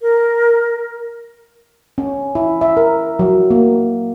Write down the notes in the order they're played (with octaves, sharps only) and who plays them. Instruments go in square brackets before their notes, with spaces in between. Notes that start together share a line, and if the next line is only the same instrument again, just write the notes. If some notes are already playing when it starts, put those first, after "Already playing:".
[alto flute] A#4
[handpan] C#4
E4
E5
A#4
F#3
A#3